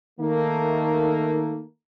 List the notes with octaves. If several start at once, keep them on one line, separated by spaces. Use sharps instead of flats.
D#3 A3 A#3